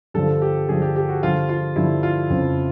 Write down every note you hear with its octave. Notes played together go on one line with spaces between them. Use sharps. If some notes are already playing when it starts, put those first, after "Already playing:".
G2 D3 F3 A4
G4
G2 D3 F3 G#4
G4
G4
F#4
G2 D3 F3 F4
F4
G2 D3 F3 E4
F4
F2 C#3 F3